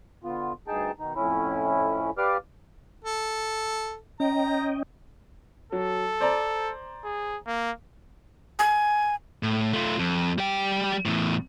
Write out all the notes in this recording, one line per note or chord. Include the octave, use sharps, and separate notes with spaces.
D3 B3 F4
D2 G2 D#4 G#4 G5 A5
B2 D#3 D#4
F2 A2 C#4 E4
G4 B4 D5 F5 D6 F6
A4
C#4 D#5 G5 A#5
F#3 A4
C5 D5 A#5
G#4
A#3
G#5
A2
A3 F4
F2
G3 G5
E2 A2